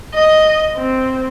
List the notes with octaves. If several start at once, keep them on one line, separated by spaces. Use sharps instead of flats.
D#5
C4